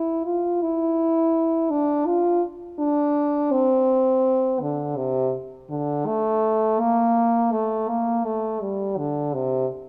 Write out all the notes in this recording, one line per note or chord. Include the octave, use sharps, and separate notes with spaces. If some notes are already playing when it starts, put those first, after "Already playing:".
Already playing: E4
F4
E4
D4
F4
D4
C4
D3
C3
D3
A3
A#3
A3
A#3
A3
G3
D3
C3